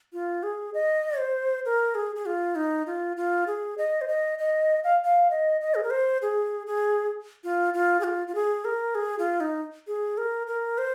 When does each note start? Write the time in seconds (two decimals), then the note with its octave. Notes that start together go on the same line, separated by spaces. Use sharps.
0.13 F4
0.43 G#4
0.74 D#5
1.18 C5
1.65 A#4
1.95 G#4
2.16 G#4
2.26 F4
2.55 D#4
2.86 F4
3.17 F4
3.47 G#4
3.78 D#5
4.01 C5
4.08 D#5
4.39 D#5
4.84 F5
5.04 F5
5.31 D#5
5.61 D#5
5.75 G#4
5.83 A#4
5.90 C5
6.22 G#4
6.67 G#4
7.44 F4
7.74 F4
8.00 G#4
8.04 F4
8.28 F4
8.35 G#4
8.65 A#4
8.95 G#4
9.19 F4
9.40 D#4
9.87 G#4
10.18 A#4
10.47 A#4
10.78 C5